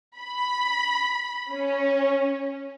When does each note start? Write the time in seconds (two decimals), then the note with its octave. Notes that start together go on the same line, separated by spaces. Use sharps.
0.18 B5
1.52 C#4